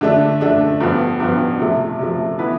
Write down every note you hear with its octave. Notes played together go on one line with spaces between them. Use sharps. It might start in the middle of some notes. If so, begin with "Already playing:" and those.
D3 A3 D4
D3 A3 D4
G2 F3 B3
G2 F3 B3
C3 F3 A3
C3 F3 A3
E3 B3 E4 B4